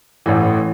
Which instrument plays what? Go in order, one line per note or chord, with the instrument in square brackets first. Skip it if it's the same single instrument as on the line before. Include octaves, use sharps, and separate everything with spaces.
[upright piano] A1 A2 E3